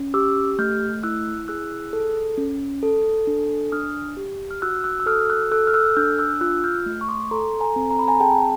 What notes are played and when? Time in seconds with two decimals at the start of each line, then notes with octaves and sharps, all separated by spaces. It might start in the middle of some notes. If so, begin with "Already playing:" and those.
Already playing: C#4
0.14 G4 D6 E6
0.59 A3 F6 G6
1.03 E4 E6 F#6
1.48 G#4 E6 F#6
1.93 A4
2.38 C#4
2.83 A4
3.27 D4
3.72 D4 D#6 F6
4.17 G4
4.51 F6
4.62 F#4 E6 F#6
4.84 E6 F#6
5.00 E6
5.06 A4 D#6 F6
5.30 E6 F#6
5.52 A4 E6 F#6
5.67 F6
5.74 E6 F#6
5.97 D4 F6 G6
6.19 E6 F#6
6.41 F4 E6 F#6
6.64 F6 G6
6.86 A3
7.01 C#6
7.08 C6 D6
7.31 A4 A#5 C6
7.61 G#5 A#5
7.76 C4
7.91 A#5
7.99 B5
8.08 G#5 A#5
8.20 G#4 G5 A5